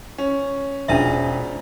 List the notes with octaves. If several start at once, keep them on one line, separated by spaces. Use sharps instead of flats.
C#4
E1 G#2 C#4 D4 F4 E5 D#6